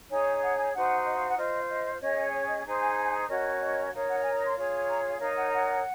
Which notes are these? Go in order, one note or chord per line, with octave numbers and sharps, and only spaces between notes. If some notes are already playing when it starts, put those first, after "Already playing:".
D#4 G#4 C#5 G#5
F#5
G#5
D#4 F#4 C5 F#5
D#5
F5
F#5
F4 C5 D#5
D#5
C#4 G#4 C#5 D#5
C#5
D#5
D#4 G#4 C5
G#5
G#5
C#4 F#4 A#4 C#5 D#5
D#5
D#4 A#4 C#5 F5
F#5
F#5
G#5
A#5
C6
F4 G#4 C#5
A#5
F5
D#4 A#4 C#5 F5
F#5
F#5